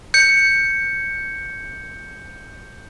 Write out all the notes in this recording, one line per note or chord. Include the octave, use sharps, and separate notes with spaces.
G6 C#7